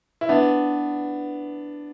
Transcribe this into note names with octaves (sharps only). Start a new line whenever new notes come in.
E4
B3 D4